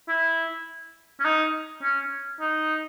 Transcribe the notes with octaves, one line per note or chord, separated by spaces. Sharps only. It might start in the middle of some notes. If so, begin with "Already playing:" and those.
E4
C#4
D#4
C#4
D#4